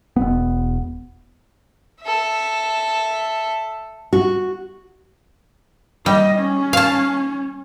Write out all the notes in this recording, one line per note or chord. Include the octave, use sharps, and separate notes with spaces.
E1 B3
A4 E5
F#4
G3 D#5
C#4
F5 A5